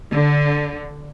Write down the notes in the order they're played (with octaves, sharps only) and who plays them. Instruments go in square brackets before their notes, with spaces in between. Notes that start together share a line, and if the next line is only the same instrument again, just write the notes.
[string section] D3